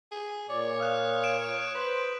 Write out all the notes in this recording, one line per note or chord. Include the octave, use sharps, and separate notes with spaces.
G#4
A#2 C#5 D5
F5 D#6 F#6
D7 E7
B4 C5